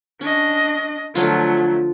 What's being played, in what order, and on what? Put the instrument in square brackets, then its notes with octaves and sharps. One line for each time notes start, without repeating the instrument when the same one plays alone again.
[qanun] C#4 [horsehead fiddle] D4 D#5
[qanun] D3 F3 F4 [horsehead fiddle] F#3 A3